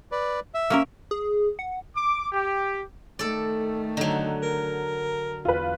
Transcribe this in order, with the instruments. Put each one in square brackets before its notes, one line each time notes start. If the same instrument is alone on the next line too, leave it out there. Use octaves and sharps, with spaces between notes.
[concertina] B4 D5
E5
[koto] A#3 C#4 A#4
[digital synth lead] G#4
F#5
[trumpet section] D6
G4
[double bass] D#3 A3 [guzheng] A4 D5
[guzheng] D3 F#3 [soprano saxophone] D#4
[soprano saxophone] A#4
[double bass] E2 [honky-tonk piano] F4 B4